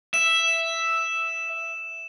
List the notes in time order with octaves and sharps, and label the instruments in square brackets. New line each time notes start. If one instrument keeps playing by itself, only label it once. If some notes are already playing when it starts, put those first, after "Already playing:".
[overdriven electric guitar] E5 [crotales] E7